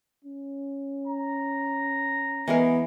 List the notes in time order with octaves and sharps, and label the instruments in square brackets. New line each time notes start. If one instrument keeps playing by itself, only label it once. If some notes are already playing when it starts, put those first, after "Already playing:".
[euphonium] C#4
[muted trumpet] A#5
[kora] E3 G#3 A#4 [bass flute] B3